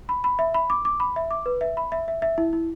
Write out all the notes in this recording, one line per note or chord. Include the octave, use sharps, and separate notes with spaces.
B5
B5
E5
B5
D6
D6
B5
E5
D6
B4
E5
B5
E5
E5
E5
E4
E4